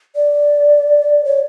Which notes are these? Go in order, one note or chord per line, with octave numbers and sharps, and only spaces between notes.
D5
C#5